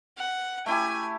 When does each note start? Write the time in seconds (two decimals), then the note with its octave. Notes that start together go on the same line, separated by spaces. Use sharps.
0.16 F#5
0.66 A3 E4 G4 G#5